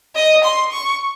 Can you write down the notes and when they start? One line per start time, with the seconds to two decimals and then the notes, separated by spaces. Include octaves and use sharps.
0.15 D#5
0.44 C6
0.72 C#6